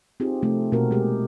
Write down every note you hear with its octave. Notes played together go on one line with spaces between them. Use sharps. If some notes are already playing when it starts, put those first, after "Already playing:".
C4 D#4 F4 G4 G#4
C3 F3 A3 C4
B2 A#3 C4 F#4 A4 A#4
G#3 G4 G#4